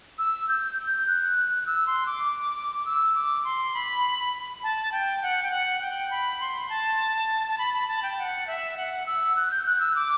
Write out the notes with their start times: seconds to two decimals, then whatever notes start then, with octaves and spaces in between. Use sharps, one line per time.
0.18 E6
0.49 G6
0.78 G6
1.07 F#6
1.67 E6
1.87 C6
2.06 D6
2.85 E6
3.15 D6
3.45 C6
3.74 B5
4.63 A5
4.92 G5
5.23 F#5
5.43 G5
5.51 F#5
5.82 G5
6.11 B5
6.40 C6
6.69 A5
7.49 A5
7.58 B5
7.74 B5
7.88 A5
8.03 G5
8.19 F#5
8.47 E5
8.77 F#5
9.06 E6
9.36 F#6
9.51 G6
9.66 F#6
9.81 E6
9.95 D6